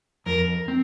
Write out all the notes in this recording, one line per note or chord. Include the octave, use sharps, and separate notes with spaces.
F2 A#4
C4